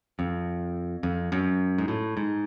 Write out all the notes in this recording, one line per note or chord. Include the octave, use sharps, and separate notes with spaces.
F2
F2
F#2
G#2
A2
G#2